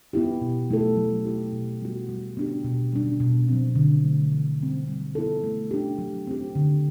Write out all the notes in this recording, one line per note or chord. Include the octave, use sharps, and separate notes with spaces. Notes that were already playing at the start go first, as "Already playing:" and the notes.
B3 E4 G4
B2
F#3 A3 E4 A4
F#3
A3 E4 G4
B2
G3 B3 F#4
G3
B3 D4 G4
B2
G3 D4
B2
F#3 C4
D3
F#3 A3
E3
G3 C4
G3
B3 E4 A4
A3
D4 G4
F#3
C4 G4
D3